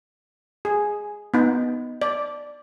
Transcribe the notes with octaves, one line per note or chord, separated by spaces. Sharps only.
G#4
B3 D#4
D5